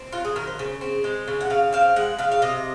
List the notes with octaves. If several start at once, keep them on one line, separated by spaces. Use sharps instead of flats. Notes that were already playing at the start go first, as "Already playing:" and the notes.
Already playing: C4
F#3 F4
G#4
D#3 A#4
C5
C#3
C4
G#3
C#3
F#5
C#3 F5
C4 F5
G#3 F#5
C#3 F5
F5
C3 D#5